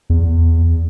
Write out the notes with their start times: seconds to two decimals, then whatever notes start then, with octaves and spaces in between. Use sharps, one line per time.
0.10 E2